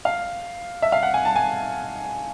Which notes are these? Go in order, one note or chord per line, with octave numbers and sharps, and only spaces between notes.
F5
E5
F5
F#5
G#5
A5
G#5